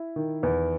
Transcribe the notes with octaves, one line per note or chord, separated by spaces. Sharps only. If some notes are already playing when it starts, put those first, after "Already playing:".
Already playing: E4
D#3
E2